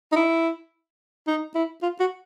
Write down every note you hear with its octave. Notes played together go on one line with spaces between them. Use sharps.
D#4
E4
D#4
E4
F4
F#4